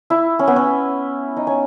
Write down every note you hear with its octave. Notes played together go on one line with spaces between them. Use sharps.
E4
C#4
B3
C#4
D#4
C#4